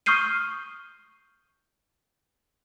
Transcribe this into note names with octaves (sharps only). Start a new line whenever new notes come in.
C#6 D#6 F6 G6 C7 D#7